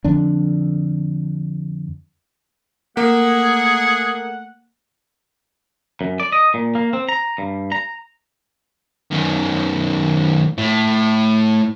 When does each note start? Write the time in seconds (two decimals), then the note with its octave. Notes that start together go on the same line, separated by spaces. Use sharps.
0.04 F2 D3 D4
2.97 A3 A#3 G#4 F#5
6.01 F#2
6.20 D5
6.32 D#5
6.54 A#2
6.75 A#3
6.93 C4
7.09 A#5
7.38 G2
7.72 A#5
9.11 F#2 D#3
10.58 A2